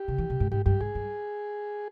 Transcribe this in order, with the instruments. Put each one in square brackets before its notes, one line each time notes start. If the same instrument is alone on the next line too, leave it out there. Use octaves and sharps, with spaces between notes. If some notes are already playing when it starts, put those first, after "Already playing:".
Already playing: [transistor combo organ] G4
[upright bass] C#3
E3
C3
G#2
[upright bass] G#2 [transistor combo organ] G4
[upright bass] G2 [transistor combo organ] G4
[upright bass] G#2 [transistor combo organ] G#4
[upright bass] G2